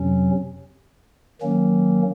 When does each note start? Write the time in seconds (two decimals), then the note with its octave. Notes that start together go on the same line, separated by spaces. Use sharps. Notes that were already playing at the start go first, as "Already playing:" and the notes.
Already playing: F2 C3 F#3 C#4
1.42 D#3 F#3 A#3 C#4